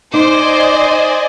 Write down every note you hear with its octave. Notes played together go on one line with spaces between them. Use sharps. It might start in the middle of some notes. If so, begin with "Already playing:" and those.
D#4 C5 D5 D#5 G#5 D6